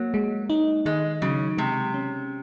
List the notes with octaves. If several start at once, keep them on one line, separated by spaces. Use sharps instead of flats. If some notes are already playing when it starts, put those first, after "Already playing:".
Already playing: F#3 A#3
G#3
D#4
D#3 G#3
C#3 F#3
C3 G#3
C#4